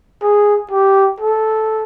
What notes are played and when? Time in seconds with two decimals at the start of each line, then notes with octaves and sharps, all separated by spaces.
0.22 G#4
0.71 G4
1.20 A4